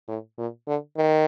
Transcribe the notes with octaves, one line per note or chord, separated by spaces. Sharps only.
A2
A#2
D3
D#3